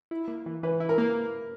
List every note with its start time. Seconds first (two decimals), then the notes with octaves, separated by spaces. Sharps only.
0.11 E4
0.28 A#3
0.46 E3
0.63 E3 B4
0.80 E4
0.89 A#4
0.98 A#3